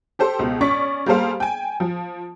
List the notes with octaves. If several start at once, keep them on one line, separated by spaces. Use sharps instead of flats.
G4 A4 C5
C#2 B2
C#4 D5 C#6 B6
G3 A#3 G#4 A4 C5 F5
G5 G#5
F3